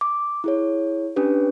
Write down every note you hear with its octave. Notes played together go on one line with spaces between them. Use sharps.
D6
E4 G#4 C#5
C#4 D4 G4 B4